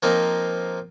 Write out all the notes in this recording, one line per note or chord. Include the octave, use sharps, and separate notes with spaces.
F3 A#3 C4 D#4